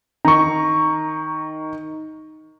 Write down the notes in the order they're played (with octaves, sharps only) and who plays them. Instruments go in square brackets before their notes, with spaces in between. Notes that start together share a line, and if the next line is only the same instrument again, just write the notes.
[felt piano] D#3 [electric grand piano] A#5 C#6